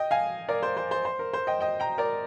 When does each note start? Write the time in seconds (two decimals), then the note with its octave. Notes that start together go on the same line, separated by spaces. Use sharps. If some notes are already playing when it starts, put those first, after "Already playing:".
Already playing: D#5 G5
0.11 F5 G#5
0.48 A#4 D5
0.63 C5
0.77 C5
0.91 C5
1.05 C5
1.19 A#4
1.33 C5
1.47 D#5 G5
1.61 D#5 G5
1.80 G5 A#5
1.98 A#4 D5